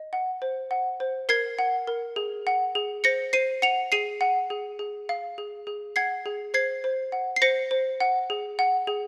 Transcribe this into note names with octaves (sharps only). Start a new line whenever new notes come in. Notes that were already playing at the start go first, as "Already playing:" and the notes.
Already playing: D#5
F#5
C5
F#5
C5
A#4 G#6 C7
F#5
A#4
G#4
F#5
G#4
C5 A#6 C#7
C5 C7 D#7
F#5 C#7 F7
G#4 C7 D#7
F#5
G#4
G#4
F5
G#4
G#4
F#5 G#6 C7
G#4
C5 G#6 C7
C5
F#5
C7
C5 A#6 C#7
C5
F#5
G#4
F#5
G#4